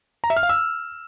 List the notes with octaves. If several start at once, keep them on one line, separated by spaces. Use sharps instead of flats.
A#5
E5
F6
F5
E6